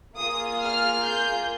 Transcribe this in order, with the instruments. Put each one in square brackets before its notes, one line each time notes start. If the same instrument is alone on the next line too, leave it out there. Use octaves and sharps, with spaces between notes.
[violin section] A#3 F4 G#4 D#6
F6
G6